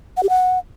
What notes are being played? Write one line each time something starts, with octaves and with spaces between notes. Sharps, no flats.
F#5
G4
F#5